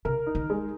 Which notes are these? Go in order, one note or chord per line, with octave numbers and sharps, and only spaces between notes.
C3 A#4
D#4
D#3
G#3